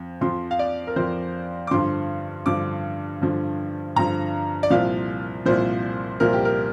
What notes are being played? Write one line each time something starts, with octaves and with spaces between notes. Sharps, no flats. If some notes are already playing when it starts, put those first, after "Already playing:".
Already playing: F2
F2 F3 C6
F5
D5
A#4
F2 F3 C5
D6
G2 D3 F3 C6
G2 D3 F3 D6
G2 D3 F3
G2 D3 F3 A#5
D5
C2 A#2 F3 F5
C2 A#2 F3 C5
C2 A#2 F3 A#4
G4
A#4